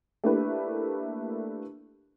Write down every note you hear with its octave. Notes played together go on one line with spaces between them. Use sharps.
A3 A#3 D4 E4 G4 B4